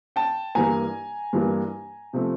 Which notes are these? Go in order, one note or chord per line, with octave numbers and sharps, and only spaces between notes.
G5 A5
G2 E3 G3 A#3 G#5 A#5
G2 E3 G3 A#3
C3 F3 A3